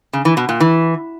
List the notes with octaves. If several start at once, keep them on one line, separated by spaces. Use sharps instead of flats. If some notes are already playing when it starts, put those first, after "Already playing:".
C#3
E3
B2
A#2
E3